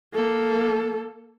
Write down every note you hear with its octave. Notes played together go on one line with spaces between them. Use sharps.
A#3 A4